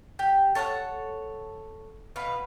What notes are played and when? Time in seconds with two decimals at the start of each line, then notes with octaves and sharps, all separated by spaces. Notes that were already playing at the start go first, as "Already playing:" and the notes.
0.19 G4
0.55 A4 C#5 F5 F#5
2.16 B2 B4 F5